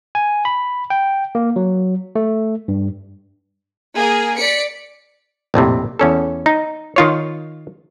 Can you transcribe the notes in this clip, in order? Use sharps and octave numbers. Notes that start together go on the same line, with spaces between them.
G#5
B5
G5
A#3
F#3
A3
G2
A#3 G#4 A#4
D5 B6 C#7 D7
A#1 F2 A2 C3
E2 C#4 A4
D#4
D#3 F4 C#5